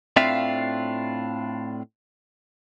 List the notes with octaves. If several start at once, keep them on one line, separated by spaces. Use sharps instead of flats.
A2 C4 D4 F4 E5 F5